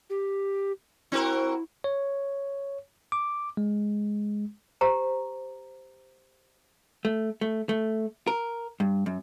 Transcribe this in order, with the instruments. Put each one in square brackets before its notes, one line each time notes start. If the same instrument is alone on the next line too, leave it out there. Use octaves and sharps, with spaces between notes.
[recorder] G4
[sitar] C4 F#4 A#4 [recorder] E4
[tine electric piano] C#5
D6
G#3
[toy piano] G4 C5 A#5
[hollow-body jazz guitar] A3
A3
A3
A#4
G2
F#2